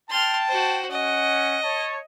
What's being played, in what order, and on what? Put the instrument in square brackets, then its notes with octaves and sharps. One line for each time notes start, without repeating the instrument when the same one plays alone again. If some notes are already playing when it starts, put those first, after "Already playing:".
[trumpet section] G5 A5 [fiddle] C6 F6
[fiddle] F#4 C5
[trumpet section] C#4 F#5 [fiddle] D#5
[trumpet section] C#5 A5